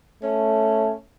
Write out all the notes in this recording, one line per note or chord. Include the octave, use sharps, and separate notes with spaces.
A3 C#4